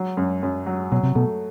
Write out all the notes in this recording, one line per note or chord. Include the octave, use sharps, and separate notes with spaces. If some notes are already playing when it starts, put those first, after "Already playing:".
Already playing: F#3
F#2
F#2
F#3
B2 F#3
C3
B2 A3